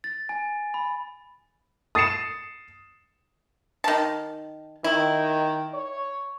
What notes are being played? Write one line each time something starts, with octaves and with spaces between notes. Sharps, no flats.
A6
G#5
B5
D#6 A6 C7 C#7 E7
D#3 A5
D#3 E4
C#5